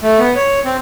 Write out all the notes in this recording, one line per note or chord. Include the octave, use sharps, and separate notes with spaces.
A3
B3
C#5
C4